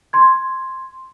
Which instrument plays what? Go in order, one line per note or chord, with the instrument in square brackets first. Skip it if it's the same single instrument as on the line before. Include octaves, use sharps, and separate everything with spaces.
[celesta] C6 G#6